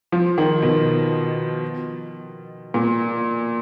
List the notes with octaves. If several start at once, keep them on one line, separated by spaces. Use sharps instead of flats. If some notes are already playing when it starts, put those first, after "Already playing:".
F3
D#3
B2
A#2